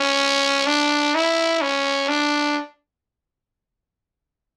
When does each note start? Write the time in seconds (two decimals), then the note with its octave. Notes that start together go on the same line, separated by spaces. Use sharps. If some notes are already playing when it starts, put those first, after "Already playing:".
Already playing: C#4
0.67 D4
1.15 E4
1.61 C#4
2.09 D4